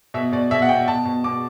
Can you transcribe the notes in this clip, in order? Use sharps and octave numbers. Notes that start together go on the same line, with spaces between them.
B2 E5
B2 D5
B2 E5
F#5
B2 G5
B2 A5
B2
B2 D6